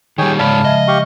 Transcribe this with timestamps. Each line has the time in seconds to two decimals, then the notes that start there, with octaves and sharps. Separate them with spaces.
0.18 D#3 G3 G#4 C#5 G5
0.39 G#2 C#3 G#3 C#5 D5 F5 A5 B5
0.65 F3 D#5 E5
0.88 G4 F5 C#6